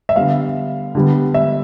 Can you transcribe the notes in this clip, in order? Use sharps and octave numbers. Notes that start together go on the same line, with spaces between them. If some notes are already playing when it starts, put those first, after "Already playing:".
E5
D3 G3 B3 F5
D3 G3 B3
E5